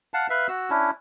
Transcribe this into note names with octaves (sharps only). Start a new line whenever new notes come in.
F5 F#5 A5
B4 E5 F5
F#4 E6
C#4 D4 E4